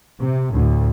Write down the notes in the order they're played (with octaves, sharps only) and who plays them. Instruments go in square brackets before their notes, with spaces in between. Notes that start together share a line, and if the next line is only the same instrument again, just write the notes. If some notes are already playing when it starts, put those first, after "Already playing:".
[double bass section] C3
D2 A2